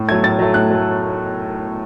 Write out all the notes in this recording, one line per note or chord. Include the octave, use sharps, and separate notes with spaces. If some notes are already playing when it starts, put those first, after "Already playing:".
Already playing: A2
F#3 A3 G#6
A2 A6
F#3 A3
A2 F#6
F#3 A3